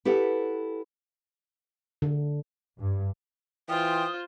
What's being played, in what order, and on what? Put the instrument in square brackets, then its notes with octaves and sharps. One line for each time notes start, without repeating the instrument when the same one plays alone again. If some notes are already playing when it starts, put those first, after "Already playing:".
[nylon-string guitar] E4 G4 A4 B4 F#5
[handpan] D3
[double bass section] G2
[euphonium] E3 [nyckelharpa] F4 C5 [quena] G5 [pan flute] D#6